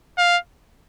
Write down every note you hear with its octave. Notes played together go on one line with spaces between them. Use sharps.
F5